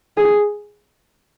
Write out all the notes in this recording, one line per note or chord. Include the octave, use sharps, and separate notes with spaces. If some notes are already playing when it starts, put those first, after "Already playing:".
G#4